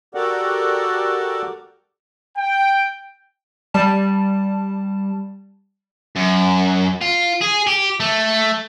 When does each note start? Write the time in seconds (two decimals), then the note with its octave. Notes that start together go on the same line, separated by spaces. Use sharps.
0.15 F#4 G4 A4 A#4 D5 F#5
2.37 G5
3.74 G3 A5
6.16 F#2
7.02 F4
7.42 G#4
7.67 G4
8.00 A3